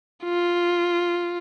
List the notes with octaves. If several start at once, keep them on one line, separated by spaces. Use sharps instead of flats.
F4